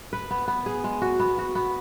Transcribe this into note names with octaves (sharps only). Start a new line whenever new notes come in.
B4
B3
B3
G#4
G#3
F#4
B3
F#4
B3